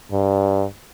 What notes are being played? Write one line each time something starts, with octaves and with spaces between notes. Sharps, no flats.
G2